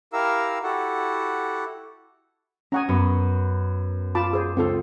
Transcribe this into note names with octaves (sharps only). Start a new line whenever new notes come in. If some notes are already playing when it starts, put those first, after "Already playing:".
E4 G4 A#4 F5 A#5 E6
E4 F#4 G4 A4 F#5
C#4 F#5 G#5 A#5 C#6 D#6
F#2 B3
F4 A5 B5 D6
G#4 C5
C#2 C4 F4 A4